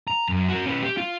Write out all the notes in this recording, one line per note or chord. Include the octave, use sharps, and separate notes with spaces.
A#5
F#2
F#4 A#4
C#4 B4
G4
F4